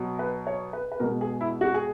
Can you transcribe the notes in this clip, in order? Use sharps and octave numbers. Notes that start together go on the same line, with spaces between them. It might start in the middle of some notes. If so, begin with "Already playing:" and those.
Already playing: B2 F#3
B4
C#5
B4
B4
B2 G#3 A#4
G#4
E4
F#4
G#4